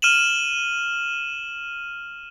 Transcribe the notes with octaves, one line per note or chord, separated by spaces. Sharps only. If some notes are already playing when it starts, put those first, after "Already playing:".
F6 D#7 E7 F#7